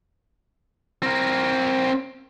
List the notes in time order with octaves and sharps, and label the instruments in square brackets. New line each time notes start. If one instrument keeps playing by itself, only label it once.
[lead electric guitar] C4 A#4